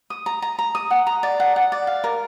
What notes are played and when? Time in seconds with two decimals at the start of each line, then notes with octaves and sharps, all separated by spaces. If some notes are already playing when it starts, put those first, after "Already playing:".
0.10 D#6
0.26 A#5
0.42 A#5
0.59 A#5
0.75 D#6
0.91 F#5
1.07 A#5
1.23 D5
1.40 F#5
1.56 F#5
1.72 D5
1.87 F5
2.04 A#4